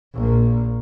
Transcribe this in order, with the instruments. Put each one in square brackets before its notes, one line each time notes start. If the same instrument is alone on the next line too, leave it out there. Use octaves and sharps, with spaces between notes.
[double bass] A#1 A#3